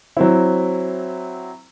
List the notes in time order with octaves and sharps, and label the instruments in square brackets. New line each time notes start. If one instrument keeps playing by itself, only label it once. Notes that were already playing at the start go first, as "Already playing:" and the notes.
[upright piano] F#3 C4 E4